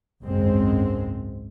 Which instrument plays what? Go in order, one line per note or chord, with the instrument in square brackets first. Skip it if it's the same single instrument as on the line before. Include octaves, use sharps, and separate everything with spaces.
[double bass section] G#1 C#2 F#2 C#3 G#3 C4